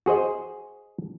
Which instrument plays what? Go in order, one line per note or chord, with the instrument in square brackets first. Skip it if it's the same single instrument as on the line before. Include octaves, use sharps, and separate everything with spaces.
[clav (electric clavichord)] F#4 G#4 C5 D#5